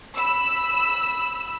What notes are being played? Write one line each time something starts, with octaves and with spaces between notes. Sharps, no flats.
B5 E6